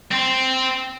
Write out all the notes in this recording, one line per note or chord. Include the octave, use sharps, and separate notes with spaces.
C4